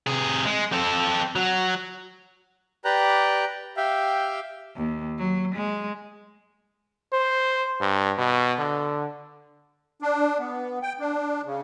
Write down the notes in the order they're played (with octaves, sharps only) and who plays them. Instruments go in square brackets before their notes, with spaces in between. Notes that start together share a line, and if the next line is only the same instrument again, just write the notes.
[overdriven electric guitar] C3 G#4
G#3
C4 A4
F#3
[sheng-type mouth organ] G4 B4 D5 G5 A#5 F#6
G4 E5 F5 G5
[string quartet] D#2
F#3
G#3
[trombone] C5
G2
B2
D3
[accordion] D4
B3
G5
D4
C#3